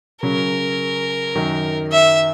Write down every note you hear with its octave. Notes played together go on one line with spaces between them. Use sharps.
C#3 F#3 C#4 A#4
F#2 D#3 F#3
E5